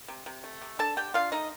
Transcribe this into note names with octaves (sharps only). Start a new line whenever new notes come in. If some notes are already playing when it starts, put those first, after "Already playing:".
C3
C3
A3
C3
D4 A4 A5
D3 G4 G5
D4 F4 F5
A3 D#4 D#5